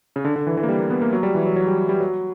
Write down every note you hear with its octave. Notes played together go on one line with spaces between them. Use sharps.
C#3
D3
D3
E3
E3
A#3
G3
A#3
B3
A#3
F#3
G3
E3
F#3
F#3
G3
G3
F#3